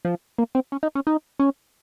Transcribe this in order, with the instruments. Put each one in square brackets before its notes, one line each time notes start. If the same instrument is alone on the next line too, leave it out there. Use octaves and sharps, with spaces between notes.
[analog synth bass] F3
A#3
C4
C#4
D#4
C#4
D#4
C#4